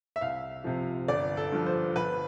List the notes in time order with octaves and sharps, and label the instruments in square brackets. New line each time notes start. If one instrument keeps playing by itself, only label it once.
[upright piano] E5
C2 F5
C3 F3
G1 D5
A4
G2 F3
C5
G1 B4